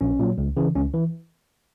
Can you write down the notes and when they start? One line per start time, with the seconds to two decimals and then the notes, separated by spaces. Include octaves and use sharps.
0.01 A#1 C#4
0.19 A#2 F#3
0.38 C#2
0.57 C#3 E3
0.75 C#2 C#4
0.93 E3